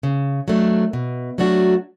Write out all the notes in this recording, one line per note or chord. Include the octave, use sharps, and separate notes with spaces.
C#3
F#3 A3 D4
B2
F#3 A3 D4 F#4